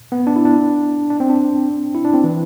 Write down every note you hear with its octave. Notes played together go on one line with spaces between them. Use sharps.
B3
D4
E4
D4
D4
C4
D4
E4
D4
C4
E3